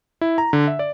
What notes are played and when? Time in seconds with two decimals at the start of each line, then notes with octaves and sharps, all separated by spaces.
0.21 E4
0.38 A#5
0.53 D3
0.67 E5
0.79 D5